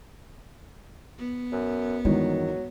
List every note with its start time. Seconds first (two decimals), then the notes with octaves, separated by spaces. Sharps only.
1.19 B3
1.52 F#2
2.05 E2 G2 D#3 F#3 G#3